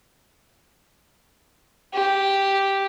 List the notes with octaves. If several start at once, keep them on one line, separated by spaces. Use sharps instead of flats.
G4